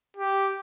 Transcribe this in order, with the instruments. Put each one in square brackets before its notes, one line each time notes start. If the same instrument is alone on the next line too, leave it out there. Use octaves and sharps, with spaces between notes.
[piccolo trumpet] G4